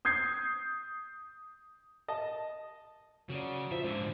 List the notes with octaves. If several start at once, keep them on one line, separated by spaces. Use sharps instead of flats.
D#6 G6 G#6 C7
D#5 A5
C#3 F#3 A#4 D5
F3 E5
G#2 D3